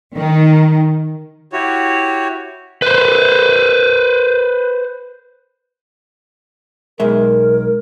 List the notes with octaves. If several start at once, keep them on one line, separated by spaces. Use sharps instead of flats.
D#3
E4 F#4 G4 C#5
B4 C5
B1 G#3 A#4 E5